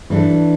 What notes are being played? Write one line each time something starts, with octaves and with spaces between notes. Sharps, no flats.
E3 A3 D4 A4